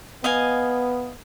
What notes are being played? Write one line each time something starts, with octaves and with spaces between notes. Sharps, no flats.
B3 D#5 F5 G#5